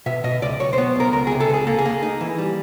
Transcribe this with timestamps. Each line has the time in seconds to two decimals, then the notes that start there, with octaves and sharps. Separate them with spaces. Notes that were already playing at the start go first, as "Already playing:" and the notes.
0.06 B2 E5
0.24 B2 D#5
0.42 C#2 D5
0.60 B1 C#5
0.73 C5
0.78 B3
0.96 B1 A#4
1.13 C#2 A#4
1.27 C3 G#4
1.40 A4
1.50 C#2 G#4
1.67 A#3 A4
1.79 G#4
1.85 A#3
2.03 D#4
2.21 E3
2.38 G3